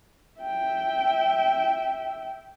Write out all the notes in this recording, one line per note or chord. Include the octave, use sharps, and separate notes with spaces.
E5 G5